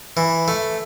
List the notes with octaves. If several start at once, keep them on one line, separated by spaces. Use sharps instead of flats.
E3
A3